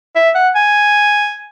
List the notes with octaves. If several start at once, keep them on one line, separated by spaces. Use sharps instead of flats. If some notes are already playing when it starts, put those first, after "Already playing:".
E5
F#5
G#5